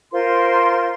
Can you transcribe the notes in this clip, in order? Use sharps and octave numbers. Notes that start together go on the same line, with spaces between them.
F4 A#4 C5 C6